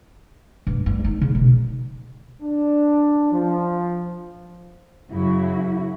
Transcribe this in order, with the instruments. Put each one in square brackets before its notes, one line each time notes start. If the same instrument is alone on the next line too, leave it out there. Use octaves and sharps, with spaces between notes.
[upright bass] G2
G2
D#4
C#3
B2
[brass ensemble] D4
F3
[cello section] F#2 C#3 F#3 E4 F#4